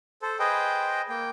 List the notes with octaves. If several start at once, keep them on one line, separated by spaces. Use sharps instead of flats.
A4 C5
G#4 B4 C5 D#5 G5
A#3 G5